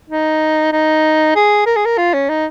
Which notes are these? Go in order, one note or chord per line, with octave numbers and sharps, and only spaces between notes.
D#4
D#4
G#4
A#4
G#4
A#4
F4
C#4
D#4